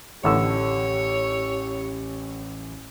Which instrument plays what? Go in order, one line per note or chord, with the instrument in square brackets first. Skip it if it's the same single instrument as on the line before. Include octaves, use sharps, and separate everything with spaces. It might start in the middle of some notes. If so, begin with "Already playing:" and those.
[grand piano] A1 C#6 E6 [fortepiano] A2 D3 E3 [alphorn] G4 [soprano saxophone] C#5